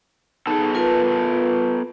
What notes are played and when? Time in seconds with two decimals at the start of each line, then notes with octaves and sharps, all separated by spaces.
0.47 B3 D#4 G#4 A4 A5
0.75 F4 A#4 B4